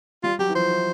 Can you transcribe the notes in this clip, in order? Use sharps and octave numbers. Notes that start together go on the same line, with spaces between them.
G3 F4
F#3 G4
E3
F3 C5
E3